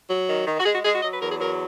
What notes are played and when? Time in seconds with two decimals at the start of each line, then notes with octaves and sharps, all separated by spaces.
0.08 F#3
0.27 D#3
0.46 D#3
0.58 F#4
0.65 G#3 G#4
0.74 F#4
0.84 G#3 G#4
0.93 F#4
1.02 F#3 D#5
1.11 B4
1.21 E2 A#4
1.30 G#4
1.39 F#3 A#4